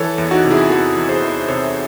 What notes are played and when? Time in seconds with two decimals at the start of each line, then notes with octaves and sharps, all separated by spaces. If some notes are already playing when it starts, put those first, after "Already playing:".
Already playing: E3 A4 C#5
0.18 E2
0.31 D#4 F#4
0.44 C3
0.50 E4 G#4
0.70 E2 F#4 A4
0.96 E3
1.09 G#4 C5
1.22 E2
1.48 C3 A4 C#5